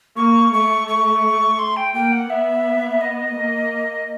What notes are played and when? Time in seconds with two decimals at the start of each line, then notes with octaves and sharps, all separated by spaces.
0.16 A#3 C#6
0.53 A3 C#6
0.88 C#6
1.59 C6
1.76 G5
1.94 A#3 G5
2.12 F#5
2.30 B3 E5
3.01 D#5
3.36 A#3